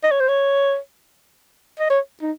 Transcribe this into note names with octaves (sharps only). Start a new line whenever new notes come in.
D#5
C#5
C5
C#5
D#5
C#5
D#4